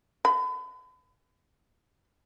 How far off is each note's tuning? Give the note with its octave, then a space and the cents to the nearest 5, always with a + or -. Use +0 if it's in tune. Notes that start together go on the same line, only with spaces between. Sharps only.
B5 +40